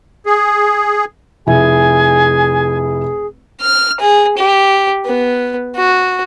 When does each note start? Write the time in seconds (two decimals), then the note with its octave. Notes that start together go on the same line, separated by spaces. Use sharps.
0.26 G#4
1.47 F1 E4 G#4 G#5
3.62 F6
4.00 G#4
4.37 G4
5.06 B3
5.76 F#4